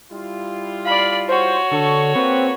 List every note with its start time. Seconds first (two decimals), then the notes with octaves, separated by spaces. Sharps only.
0.12 G3 E4 F4
0.85 D5 F5 B5
1.28 F#4 C5 C#5
1.71 D3 A4
2.16 A#3 C4 A4 B4